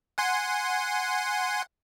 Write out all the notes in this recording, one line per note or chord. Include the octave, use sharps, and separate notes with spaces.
F#5 G#5 C6